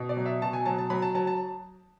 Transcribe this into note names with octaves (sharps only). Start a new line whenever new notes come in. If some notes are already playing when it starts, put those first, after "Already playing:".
Already playing: B2
D5
F#3
E5
B2 A5
G#5
F#3 A5
A5
F#3 B5
A5
F#3 A5
A5